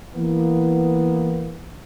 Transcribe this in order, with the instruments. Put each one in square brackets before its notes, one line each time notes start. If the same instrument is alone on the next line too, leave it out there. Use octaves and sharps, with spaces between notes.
[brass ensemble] E3 A#3 B3